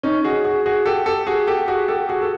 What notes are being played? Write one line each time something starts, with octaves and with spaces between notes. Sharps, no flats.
C#4 D#4
F#4 G#4
F#4 G#4
F#4 G#4
G4 A4
G4 A4
F#4 G#4
G4 A4
F#4 G#4
G4 A4
F#4 G#4
A4